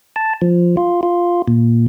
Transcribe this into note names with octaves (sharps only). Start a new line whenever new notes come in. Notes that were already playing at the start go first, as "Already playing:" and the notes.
A5
F3
F4
F4
A#2